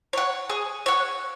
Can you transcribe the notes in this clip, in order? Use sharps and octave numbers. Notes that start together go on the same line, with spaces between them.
C#5 F#5
G#4
C#5 F#5